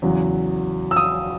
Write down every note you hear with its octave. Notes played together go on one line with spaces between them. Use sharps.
E2 C#3 F#3
E6
D#6